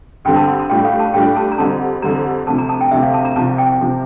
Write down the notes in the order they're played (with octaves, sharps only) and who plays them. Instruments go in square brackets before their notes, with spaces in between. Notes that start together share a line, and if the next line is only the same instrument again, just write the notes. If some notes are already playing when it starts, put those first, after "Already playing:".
[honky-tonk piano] G2 D3 G3 C4 [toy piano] G5
[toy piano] A5
A5
A5
[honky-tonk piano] A2 G3 D4 F4 [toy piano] G5
[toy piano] F5
A5
[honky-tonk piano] A2 G3 D4 F4 [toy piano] G5
[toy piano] A5
A#5
[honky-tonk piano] F2 D3 G3 [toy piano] A5
[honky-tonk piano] F2 D3 G3 [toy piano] A#5
[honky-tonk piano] D2 C3 F3 [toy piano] A5
[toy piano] A#5
A5
G5
[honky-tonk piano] D2 C3 F3 [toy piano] E5
[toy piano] F5
A5
A#5
[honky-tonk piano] C2 C3 F3 [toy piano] A5
[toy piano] G5
[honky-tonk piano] C3 F3